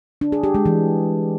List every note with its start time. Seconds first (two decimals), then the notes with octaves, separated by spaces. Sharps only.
0.21 D4
0.32 G#4
0.43 G4
0.55 G#3
0.66 E3